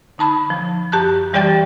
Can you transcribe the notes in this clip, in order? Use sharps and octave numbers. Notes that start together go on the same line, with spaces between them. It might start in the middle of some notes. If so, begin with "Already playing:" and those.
D3 D#4 A5 B5
F3
F#2 G4 A5 F#6
E3 G3 G4 D5 G5 A6